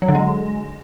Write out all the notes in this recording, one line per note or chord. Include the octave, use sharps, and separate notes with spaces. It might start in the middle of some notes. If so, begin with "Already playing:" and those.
F#3
D3
G#3